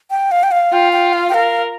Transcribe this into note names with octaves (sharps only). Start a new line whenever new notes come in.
G5
F5
G5
F5
F4 G5
G5
F5
G5
A#4 F5